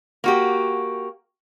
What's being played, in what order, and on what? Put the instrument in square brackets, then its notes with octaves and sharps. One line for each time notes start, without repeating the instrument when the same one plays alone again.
[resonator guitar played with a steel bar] A#3 F#4 G4